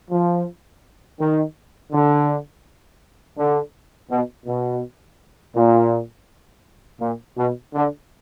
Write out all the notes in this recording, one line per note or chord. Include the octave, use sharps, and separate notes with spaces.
F3
D#3
D3
D3
B2
B2
A#2
A#2
B2
D3